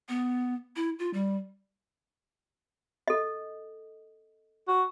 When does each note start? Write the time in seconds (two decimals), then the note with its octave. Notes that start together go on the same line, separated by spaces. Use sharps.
0.09 B3
0.76 E4
0.99 F4
1.14 G3
3.08 A4 D#5
4.68 F#4